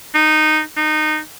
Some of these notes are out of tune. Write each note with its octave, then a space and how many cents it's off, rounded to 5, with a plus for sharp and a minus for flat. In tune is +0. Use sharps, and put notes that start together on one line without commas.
D#4 -10
D#4 -20